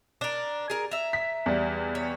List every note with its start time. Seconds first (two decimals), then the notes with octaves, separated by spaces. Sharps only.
0.21 D4 A#4
0.70 G#4 A#4
0.91 E5 A#5
1.13 B6
1.46 E2 G3
1.95 C#5